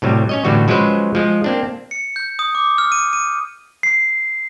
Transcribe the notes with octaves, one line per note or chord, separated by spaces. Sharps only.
A2 C3 F#3 G3
C#4 C#5 D#5
A2 D3 E3 G3 F#4
F3 F#3 G#3 C#4 B4 C5
F3 G#3
A#3 C4 D4
C#7
G6
D#6
D6
F6
D#7
D#7
C7